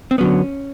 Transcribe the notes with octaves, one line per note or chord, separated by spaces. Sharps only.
C4
D3 F#3 B3 C#4